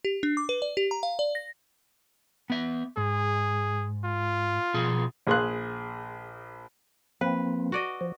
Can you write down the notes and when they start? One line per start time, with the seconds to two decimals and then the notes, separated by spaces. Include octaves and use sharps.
0.05 G4
0.23 D4
0.37 D6
0.49 B4
0.62 D5
0.77 G4
0.91 A#5
1.03 F5
1.19 D5
1.35 A#6
2.50 B3 E5
2.97 G#2 G#4
4.04 F4
4.74 B2 F3 G#4
5.27 A#1 G#4 C6 F#6
7.21 F3 A#3 C4 B4
7.72 F#4 D5 D#5
8.01 F3